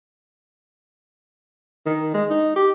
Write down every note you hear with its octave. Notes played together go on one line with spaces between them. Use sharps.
D#3
G#3
D#4
G4